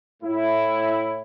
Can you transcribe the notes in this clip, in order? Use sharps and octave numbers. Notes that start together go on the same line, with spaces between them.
A2 E4